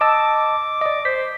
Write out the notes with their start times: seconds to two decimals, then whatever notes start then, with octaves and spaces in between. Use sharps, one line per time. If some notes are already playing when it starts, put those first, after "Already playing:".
0.01 D#5 A5 D6 E6
0.81 D5 D#5
1.05 C5 B6